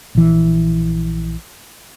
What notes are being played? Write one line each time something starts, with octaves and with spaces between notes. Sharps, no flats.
A#1 E3